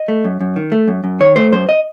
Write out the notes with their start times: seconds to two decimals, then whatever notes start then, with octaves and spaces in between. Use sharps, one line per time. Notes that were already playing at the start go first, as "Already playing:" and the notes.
Already playing: D#5
0.08 A3
0.24 F#2
0.41 F#2
0.56 D#3
0.72 A3
0.88 F#2
1.04 F#2
1.20 D#3 C#5
1.36 A3 C5
1.52 F#2 C5
1.69 D#5